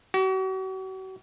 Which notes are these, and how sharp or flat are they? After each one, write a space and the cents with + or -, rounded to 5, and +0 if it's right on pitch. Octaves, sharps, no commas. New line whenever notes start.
F#4 +40